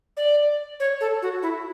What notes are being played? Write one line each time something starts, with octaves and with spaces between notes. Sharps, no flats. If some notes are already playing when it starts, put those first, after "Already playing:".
D5
C#5
A4
F#4
E4